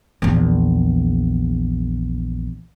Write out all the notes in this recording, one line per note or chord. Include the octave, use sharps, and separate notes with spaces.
A#1 E2